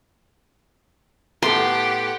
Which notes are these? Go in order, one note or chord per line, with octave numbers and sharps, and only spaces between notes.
A2 B3 G4 A4 F#5 C6